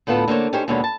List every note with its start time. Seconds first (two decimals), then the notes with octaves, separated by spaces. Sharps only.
0.07 D2 A2 B3 F4 A4
0.28 D3 A#3 C5 C#5
0.53 C#4 D#4 G4 G#4 C5 C#5
0.68 D#2 B2 D3 G#3 B3 C#5
0.84 A5